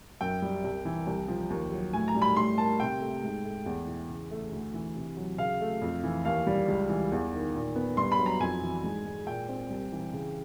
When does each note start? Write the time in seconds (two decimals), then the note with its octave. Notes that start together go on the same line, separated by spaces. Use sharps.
0.21 F#2 G5
0.42 G3
0.64 C2
0.85 E3
1.07 C2
1.28 F3
1.50 D#2
1.72 F#3
1.93 A2 G#5
2.08 A#5
2.15 G3
2.22 B5
2.36 A2 C6
2.57 A#3 A5
2.80 C3 G5
3.01 A3
3.23 G#2
3.44 A3
3.66 E2
3.87 E3
4.09 C#3
4.31 A3
4.52 D2
4.74 E3
4.96 C3
5.17 F#3
5.38 C#3 F5
5.61 A3
5.82 F2
6.03 E3
6.25 D#2 F5
6.47 G3
6.68 C#2
6.89 E3
7.12 E2
7.33 D#3
7.55 A#2
7.76 B3
7.97 G2 C6
8.12 B5
8.19 F#3
8.26 A#5
8.40 F2 G#5
8.62 E3
8.84 G#2
9.05 G#3
9.27 A#2 G5
9.49 C4
9.70 C2
9.92 E3
10.13 C#3